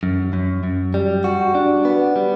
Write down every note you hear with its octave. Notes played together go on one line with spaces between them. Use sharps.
F#2
F#2
F#2
G3
F#4
D4
B3
G3